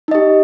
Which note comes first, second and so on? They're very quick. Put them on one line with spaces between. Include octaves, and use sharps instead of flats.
D#4 D#5 G4